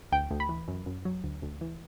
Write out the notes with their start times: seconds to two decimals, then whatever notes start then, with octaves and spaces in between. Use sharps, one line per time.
0.12 D2 G5
0.31 D2
0.40 B5
0.49 E3
0.68 F#2
0.86 F#2
1.05 F#3
1.24 D2
1.42 D2
1.61 E3